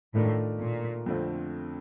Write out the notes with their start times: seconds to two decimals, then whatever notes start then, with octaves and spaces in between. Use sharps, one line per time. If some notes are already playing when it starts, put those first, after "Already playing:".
0.14 A2 D#3 A3 D4 F4 A#4
0.61 A#2
1.06 F2 D3 F3 A3 C4